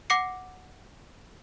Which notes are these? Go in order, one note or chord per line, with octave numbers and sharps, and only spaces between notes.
F#5 D6 A#6 C7 C#7